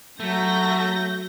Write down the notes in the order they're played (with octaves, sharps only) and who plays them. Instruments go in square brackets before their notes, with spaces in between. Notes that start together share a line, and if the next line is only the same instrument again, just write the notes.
[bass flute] F#3 [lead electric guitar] A3 [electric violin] G6 A#6